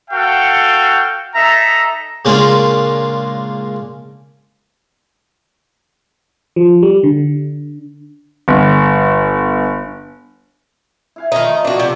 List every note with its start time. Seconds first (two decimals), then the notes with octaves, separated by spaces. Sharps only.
0.11 F#4 A4 F5 G5
1.34 D#4 A4 E5 A#5
2.25 A#2 C#3 G#3 A#3 D4 F4
6.56 F3
6.83 G3
7.03 D3
8.48 G1
11.16 E4 F5 G#5
11.32 D#3 F3 A3 D#4
11.64 D#3 A#3 B3 D4 F#4
11.79 C3